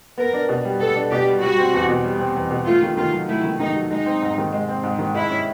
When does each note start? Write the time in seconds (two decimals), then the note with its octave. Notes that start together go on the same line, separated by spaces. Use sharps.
0.18 B3 A#4
0.34 D4
0.49 B2
0.65 G3
0.80 B3 A4
0.96 D4
1.11 B2 G4
1.27 G3
1.42 G3 F#4
1.58 C4
1.74 E2
1.89 B2
2.04 G3
2.19 C4
2.36 E2
2.51 B2
2.66 A3 F4
2.83 D#3
2.97 D#3 F4
3.13 F#3
3.28 A3 E4
3.44 D#3
3.60 D#3 D#4
3.76 F#3
3.91 G#3 D#4
4.06 C4
4.22 G#2
4.38 D#3
4.52 G#3
4.68 C4
4.83 G#2
4.99 D#3
5.14 G#3 E4
5.30 C#4